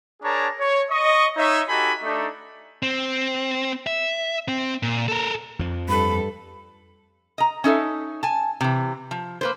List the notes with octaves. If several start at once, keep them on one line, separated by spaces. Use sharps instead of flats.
D4 G#4 A#4 C#5 A5 A#5
C#5
D#5 C#6
D#4 C#5 E5
D#4 F#4 G4 A4 G#5 B5
A3 D4 D#4
C4
E5
C4
A#2
A4 A#4
F2 F3
G2 A4 B5
D#5 A#5
C#4 D#4 A4 E5
G#5 A5
C3 E3
F3
A#3 B4 C5